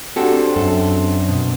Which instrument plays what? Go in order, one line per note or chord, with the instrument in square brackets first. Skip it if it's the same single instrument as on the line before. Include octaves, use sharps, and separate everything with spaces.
[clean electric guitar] C4 D4 [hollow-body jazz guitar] F#4 G4 A4
[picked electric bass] F#2 [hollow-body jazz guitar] A4
[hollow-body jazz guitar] B2